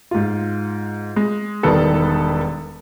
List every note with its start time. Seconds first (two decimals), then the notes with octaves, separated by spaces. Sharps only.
0.11 G#2 F4
1.16 G#3
1.63 E1 D#3 G3 B3 A4 B4